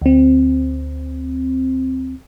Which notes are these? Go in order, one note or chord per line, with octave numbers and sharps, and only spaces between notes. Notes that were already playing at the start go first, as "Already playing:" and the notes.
D2 C4